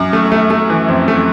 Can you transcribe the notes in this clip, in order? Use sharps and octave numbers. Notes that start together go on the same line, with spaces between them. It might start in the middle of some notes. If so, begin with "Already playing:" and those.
Already playing: F#2
A3
A3
A3
E3
F2
A3